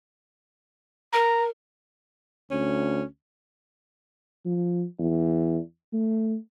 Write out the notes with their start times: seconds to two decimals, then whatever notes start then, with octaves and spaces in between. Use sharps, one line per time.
1.13 A#4 A#5
2.51 D2 C#4
4.45 F3
4.99 E2
5.93 A3